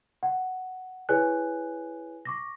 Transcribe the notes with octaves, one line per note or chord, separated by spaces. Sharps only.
F#5
E4 G#4 B4 C#5 G#5 F#6
C#6 D6 A#6